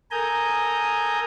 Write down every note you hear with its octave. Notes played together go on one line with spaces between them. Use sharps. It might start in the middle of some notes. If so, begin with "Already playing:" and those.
A4 A#4 G#5 A#5 D#6 G6